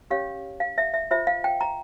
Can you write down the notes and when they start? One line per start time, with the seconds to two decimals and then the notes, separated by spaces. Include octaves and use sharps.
0.11 C#4 G4 C#5 F5
0.60 F5
0.78 E5
0.94 E5
1.11 F4 C5 E5
1.27 F5
1.44 G5
1.61 A#5